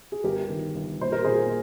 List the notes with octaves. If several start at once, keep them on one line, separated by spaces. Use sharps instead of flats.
G#4
G1 G4 A#4
D#3
G1
A#2 C5
A#4
A#2 G#4 C5